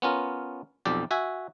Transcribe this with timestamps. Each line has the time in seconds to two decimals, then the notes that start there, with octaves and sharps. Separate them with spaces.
0.02 B3 C#4 F4 A#4
0.85 B1 F2 G4 D5
1.11 F#4 E5 G#5